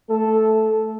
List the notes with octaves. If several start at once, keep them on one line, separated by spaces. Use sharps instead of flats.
A3 A4